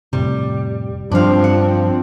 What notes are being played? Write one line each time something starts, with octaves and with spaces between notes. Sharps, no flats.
F1 A2 C3 G3
G2 F3 C4 D4 F5
F#5